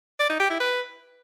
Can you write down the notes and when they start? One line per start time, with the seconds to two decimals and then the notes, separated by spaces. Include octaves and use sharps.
0.20 D5
0.30 D#4
0.40 G4
0.50 E4
0.60 B4